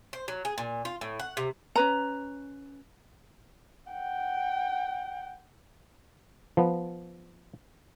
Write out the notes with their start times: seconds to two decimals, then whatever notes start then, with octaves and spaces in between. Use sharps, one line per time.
0.13 C5
0.28 F#3
0.45 G#4
0.58 A#2
0.85 F4
1.01 A2
1.19 F#5
1.37 C3
1.76 C#4 B4 A#5
3.92 F#5 G5
6.57 F3 B3